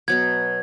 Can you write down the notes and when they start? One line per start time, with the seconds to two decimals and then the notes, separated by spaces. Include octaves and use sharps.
0.08 B2 F#3 B3 G#6